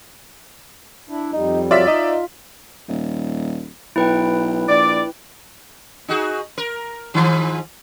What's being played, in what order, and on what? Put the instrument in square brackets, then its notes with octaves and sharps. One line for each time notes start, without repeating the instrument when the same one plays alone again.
[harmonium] D4 E4
[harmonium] F2 G3 [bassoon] D#4
[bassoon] F#3 [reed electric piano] F4 [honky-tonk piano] D5 E5 B6
[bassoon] D#4 [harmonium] F4 [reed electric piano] D#5
[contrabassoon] D#1
[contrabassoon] B1 [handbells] E4 B4 G5
[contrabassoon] A#1 [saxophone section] D5
[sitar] D#4 F#4 G#4
A#4
G#2 D#3 F3